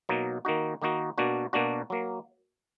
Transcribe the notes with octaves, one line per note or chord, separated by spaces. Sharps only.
B2 F#3 A#3 D#4
D#3 A#3 D#4 F#4
D#3 A#3 D#4 F#4
B2 A#3 D4 F#4
B2 A#3 D4 F#4
F#3 A#3